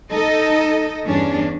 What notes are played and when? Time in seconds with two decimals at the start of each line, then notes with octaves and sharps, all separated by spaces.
0.11 D#4 A4 D#5
1.05 E2 G2 C#4 D4